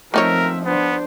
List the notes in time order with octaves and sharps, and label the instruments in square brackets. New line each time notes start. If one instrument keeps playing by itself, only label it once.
[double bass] F3 [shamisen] A3 D#4 C#5 [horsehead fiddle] C4 E5 [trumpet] A#4
[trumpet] B3 [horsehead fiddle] D4 C5